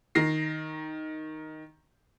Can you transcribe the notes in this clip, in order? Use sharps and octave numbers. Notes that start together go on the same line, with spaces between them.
D#3 A#6 C7